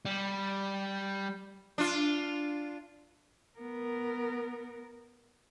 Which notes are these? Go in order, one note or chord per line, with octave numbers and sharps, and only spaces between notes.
G3
D4 F4
B3 A#4